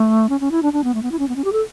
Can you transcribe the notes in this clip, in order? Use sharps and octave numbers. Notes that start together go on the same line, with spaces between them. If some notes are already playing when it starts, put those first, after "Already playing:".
Already playing: A3
C#4
C#4
E4
D4
D4
B3
A3
B3
E4
C#4
B3
C#4
G4
A4